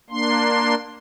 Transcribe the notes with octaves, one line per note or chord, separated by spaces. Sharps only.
A#3 D4 C6